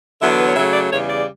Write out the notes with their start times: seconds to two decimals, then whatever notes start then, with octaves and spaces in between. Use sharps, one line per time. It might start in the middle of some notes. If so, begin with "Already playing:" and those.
0.20 E2 D3 F#3 B3 E5
0.29 D5
0.38 B4
0.46 C#5
0.56 C#3 F#3 A3 E5
0.73 D5
0.91 E2 C#3 G3 C#5
1.09 D5